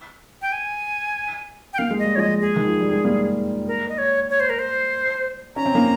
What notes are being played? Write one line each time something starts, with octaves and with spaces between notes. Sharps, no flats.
G5
G#5
G5
A#3 F5
G#3
D#5
G3
F3 G#3 C#5 D#5
G#4
D#3
F3
G3
G#3
G3 A#3
A#4
D#5
C#5
C#5
C5
A#4
C5
C#4 A#5
C4
A#3 C#4